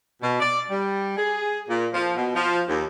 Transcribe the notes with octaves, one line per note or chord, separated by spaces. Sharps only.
B2
D5
G3
G#4
A#2
F3
B2
F3
D#2